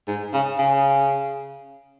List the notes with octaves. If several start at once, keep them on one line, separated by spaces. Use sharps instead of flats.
G#2
C#3
C#3